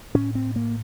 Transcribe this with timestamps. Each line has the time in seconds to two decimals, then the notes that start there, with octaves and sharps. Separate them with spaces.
0.15 A2 C#4
0.35 C4
0.56 A#3